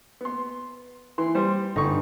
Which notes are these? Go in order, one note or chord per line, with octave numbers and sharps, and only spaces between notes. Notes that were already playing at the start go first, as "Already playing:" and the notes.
B3 C6
E3 C6
G3 C5
G1 D#4 C#6